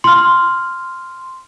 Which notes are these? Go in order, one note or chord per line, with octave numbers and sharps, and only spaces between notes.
C6 F6